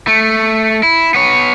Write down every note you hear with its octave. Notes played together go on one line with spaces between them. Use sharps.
A3
E4
B3 C#5